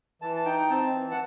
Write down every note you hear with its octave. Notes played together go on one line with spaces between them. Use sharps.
E3 A5
A5
D#4 G5
C4 A5
E3
F#5